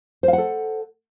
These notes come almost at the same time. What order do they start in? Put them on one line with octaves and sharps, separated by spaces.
C5 F5 F#5 A4